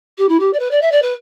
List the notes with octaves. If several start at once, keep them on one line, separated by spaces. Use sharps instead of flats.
G4
E4
G4
D5
B4
D5
E5
D5
B4